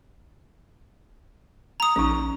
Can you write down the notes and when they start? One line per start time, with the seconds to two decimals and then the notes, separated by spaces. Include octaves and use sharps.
1.80 A#5 D#6
1.96 A#1 C#4 D#4